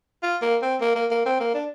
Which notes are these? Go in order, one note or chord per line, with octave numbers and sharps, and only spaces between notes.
F4
A#3
C4
A#3
A#3
A#3
C4
A#3
D4